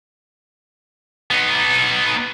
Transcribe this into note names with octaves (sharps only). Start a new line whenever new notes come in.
B3 D#4